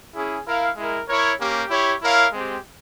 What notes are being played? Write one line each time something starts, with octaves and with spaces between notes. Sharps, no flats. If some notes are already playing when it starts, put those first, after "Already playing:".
C#4 E4 G#4
E4 A#4 F5
G#3 E4 A#4
E4 A#4 C#5
A#3 C#4 G4
E4 G4 C#5
E4 A#4 C#5 F5
G#3 C4 G4